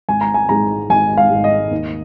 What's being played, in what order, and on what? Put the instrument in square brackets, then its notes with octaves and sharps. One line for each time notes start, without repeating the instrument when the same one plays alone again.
[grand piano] G#1 G#5
A#5
G#5
G#2 G#3 A#5
G#1 G#5
F5
G#2 G#3
D#5
D#2